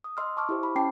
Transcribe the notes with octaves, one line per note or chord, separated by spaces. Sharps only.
D#6
D#5 C6 E6 F6
A5 C#6 D6 F6
E4 G4 C5
B5
C#4 G5 A5 D6 C7